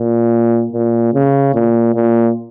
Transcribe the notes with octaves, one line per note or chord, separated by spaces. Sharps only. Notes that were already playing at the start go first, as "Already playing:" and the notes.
Already playing: A#2
A#2
C#3
A#2
A#2